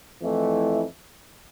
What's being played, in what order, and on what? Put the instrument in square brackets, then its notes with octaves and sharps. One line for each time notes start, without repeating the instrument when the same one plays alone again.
[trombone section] F2 E3 A3 E4